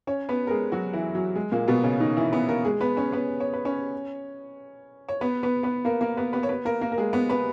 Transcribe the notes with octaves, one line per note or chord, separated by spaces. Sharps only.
C#4 C#5
B3 B4
A#4
G#3 G#4
F#3 F#4
E3 E4
F#3
G#3
A#2 A#3
B2 B3
C#3 C#4
D#3 D#4
E3 E4
B3 B4
A#3 A#4
G#3 G#4
B3 B4
C#4 C#5
B3 B4
C#5
B4
C#4 C#5
C#5
B3 B4
B3 B4
B3 B4
A#3 A#4
A#3 A#4
B3 B4
B3 B4
C#5
B3 B4
A#3 A#4
A#3 A#4
A#4
G#3 G#4
B3 B4
B3 B4